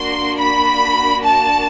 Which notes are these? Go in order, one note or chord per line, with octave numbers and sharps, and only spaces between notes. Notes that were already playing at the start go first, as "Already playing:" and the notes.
Already playing: A#3 D4 F#4 C6
B5
A5